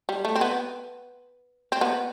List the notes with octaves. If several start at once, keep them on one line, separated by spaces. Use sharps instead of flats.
G3
A3
C4
B3
C4
B3